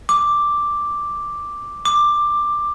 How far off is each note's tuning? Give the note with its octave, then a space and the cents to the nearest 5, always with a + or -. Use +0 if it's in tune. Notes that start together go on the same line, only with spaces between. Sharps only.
D6 +0
D6 +10